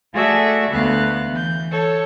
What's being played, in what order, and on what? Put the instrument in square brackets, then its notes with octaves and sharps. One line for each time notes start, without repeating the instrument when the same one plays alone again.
[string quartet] A3 F#4 G#4 A4 D5 E5
D2 B3 F5 F#6
E3 G6
A4 C#5